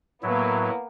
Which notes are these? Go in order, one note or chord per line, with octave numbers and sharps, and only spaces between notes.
A2 F#3 A#3 B3 E4